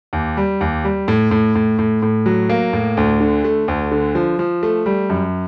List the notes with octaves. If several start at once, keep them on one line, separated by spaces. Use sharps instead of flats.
D#2
G3
D#2
G3
A2
A2
A2
A2
A2
F#3
A#3
A2
D2
D3
A3
D2
D3
F3
F3
A3
G3
F#2